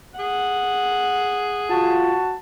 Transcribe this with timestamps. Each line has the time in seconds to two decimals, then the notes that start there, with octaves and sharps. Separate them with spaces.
0.19 G#4 F#5
1.70 F4 F#4 A5